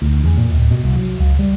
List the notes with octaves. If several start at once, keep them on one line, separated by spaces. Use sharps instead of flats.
D2
E2
A#2
D1
B2
C2
F#3
C#2
G3